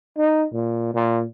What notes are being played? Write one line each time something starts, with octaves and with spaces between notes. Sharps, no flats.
D#4
A#2
A#2